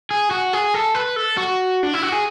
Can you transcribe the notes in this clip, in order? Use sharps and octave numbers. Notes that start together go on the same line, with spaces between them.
G#4
F#4
G#4
A4
B4
A4
F#4
D4
E4
F#4
G#4